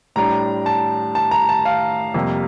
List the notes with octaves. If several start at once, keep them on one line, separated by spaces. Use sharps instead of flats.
A2 G3 D4 A#5
A5
A5
A#5
A5
F5
F2 C3 G3 A#3